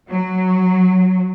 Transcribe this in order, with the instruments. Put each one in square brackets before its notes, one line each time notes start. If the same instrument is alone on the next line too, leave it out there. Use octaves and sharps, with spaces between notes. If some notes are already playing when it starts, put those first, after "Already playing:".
[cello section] F#3